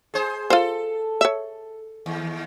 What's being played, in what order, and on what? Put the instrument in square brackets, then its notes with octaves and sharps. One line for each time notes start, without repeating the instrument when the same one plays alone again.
[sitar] G#4 C5
[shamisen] F4 C5 [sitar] A4
[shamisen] C#5 E5
[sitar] D#2